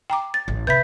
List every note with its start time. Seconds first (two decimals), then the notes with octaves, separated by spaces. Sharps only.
0.10 G5 A#5 D6
0.34 A6
0.48 A1
0.67 C3 B4 E5 B5 G6 B6